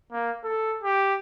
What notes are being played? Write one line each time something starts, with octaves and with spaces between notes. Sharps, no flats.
A#3
A4
G4